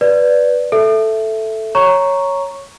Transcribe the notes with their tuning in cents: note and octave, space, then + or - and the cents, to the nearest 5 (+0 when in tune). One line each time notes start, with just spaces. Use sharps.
B4 +0 D5 +0
A4 +0 E5 +5
C#5 +0 A#5 +0 C#6 +0